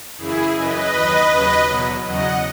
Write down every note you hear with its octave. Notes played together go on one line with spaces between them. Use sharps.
F#2 C#3 E3 E4 G#4
F#2 C#3 E3 B4 D#5
D#2 D#3 F#3
D#2 C#3 F#3
E2 B2 F#3
E2 C#3 F#3 D#5 F#5